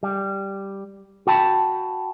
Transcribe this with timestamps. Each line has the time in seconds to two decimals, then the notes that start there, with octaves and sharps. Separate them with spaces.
0.03 G3
1.27 F#4 G5 A5 B5